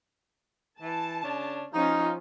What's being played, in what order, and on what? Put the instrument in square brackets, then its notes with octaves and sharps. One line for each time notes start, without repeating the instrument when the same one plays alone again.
[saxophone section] E3 [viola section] A5
[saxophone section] C#3 C#4 D4
[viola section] F3 C#4 F4 [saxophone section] D#4